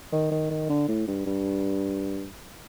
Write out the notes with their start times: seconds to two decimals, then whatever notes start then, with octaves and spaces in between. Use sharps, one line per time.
0.13 D#3
0.31 D#3
0.51 D#3
0.70 D3
0.88 A2
1.07 G2
1.26 G2